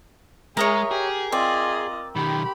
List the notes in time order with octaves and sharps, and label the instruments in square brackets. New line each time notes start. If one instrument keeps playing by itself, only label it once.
[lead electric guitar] G#3 [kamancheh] G#4 E5 [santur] A#4 [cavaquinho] C#5 D#5 A#5
[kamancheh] G4 [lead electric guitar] G#4
[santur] C4 [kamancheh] F4 D#5 [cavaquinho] D5
[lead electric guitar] B1 D#3 [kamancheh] G4 B5